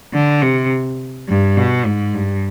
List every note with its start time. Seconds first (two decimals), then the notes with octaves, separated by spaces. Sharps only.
0.13 D3
0.42 C3
1.28 G2
1.56 B2
1.86 G#2
2.14 G2